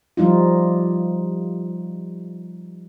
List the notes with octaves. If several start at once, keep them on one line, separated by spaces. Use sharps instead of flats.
F3 G3 D#4 F4